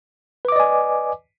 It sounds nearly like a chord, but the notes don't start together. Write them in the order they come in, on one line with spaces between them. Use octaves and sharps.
B4 D6 D#5 D5 G#5